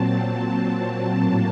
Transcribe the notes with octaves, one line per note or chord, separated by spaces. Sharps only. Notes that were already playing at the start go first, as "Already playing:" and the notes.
Already playing: A#2 F#3 C4 A5
A2 F#3 A#3